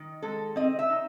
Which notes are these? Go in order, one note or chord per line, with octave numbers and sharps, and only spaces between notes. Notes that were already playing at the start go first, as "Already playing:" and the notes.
Already playing: D#3 D#4
G#3 A4
C4 D#5
E5
D#4